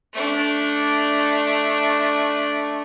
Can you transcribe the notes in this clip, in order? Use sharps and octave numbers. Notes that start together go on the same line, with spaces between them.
A3 D4